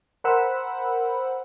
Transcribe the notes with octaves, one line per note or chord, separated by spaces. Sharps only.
A#4 C5 F#5 B5 E6